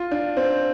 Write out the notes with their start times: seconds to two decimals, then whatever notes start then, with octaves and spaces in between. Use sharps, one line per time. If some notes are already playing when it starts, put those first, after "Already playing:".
Already playing: F4
0.11 D4
0.37 C4